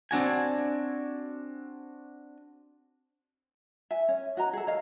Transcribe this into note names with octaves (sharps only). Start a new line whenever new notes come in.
C4 D4 F#4 G#5
E5 G#5
C#4
F#4 D#5 A#5
G#4 A4
C#5 D#5 F5